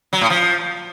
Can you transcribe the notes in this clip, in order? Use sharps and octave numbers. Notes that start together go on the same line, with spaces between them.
F#3
A2
F3